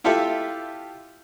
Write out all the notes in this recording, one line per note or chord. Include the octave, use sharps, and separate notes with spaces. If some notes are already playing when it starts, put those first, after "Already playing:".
E4 F4 G4 A4 E5